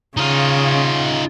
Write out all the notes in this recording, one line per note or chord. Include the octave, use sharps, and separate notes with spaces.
C#3 D#4 F4